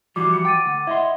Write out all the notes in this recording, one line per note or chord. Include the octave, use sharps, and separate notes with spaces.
E3 F3 G3 F#4 D6
D6 C#7
F#5 G5 D6 A6 D#7
D2
E4 D#5 E5 C6